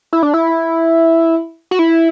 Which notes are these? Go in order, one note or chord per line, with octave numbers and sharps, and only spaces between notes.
E4
D4
E4
F#4
E4